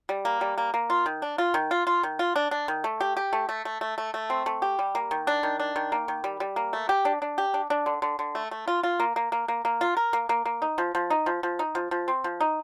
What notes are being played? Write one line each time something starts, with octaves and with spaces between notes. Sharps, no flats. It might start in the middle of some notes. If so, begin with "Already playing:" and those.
G3
A#3
G3
A#3
A#3
F4
D#3
D4
F4
D#3
F4
F4
D#3
F4
D4
D4
D#3
A3
G4
G4
A3
A3
A3
A3
A3
A3
C4
A3
G4
G3
A#3
D#3
D4
D#3
D4
D#3
A#3
D#3
G3
G3
A#3
A3
G4
D4
D4
G4
D4
D4
D3
D3
D3
A3
A3
F4
F4
A#3
A#3
A#3
A#3
A#3
F4
A#4
A#3
A#3
A#3
D#4
F3
F3
D#4
F3
F3
D#4
F3
F3
C4
F3
D#4